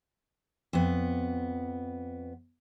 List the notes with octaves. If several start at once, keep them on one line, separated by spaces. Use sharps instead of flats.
F2 B3